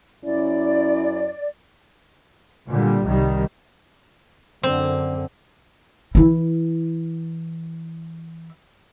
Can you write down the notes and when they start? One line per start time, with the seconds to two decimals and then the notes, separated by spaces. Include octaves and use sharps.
0.24 F#2 C#4 E4 D5
2.70 A#2 D3 G3
3.05 C2 D#3 G3
4.63 F#2 D3 C4
6.15 E3 E4